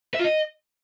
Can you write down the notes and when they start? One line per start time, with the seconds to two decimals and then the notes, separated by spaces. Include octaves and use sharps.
0.14 E5
0.19 F4
0.24 D#5